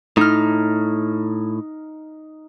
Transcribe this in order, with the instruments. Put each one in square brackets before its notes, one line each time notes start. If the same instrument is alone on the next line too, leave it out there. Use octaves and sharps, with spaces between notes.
[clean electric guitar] A2 [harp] D#4 F6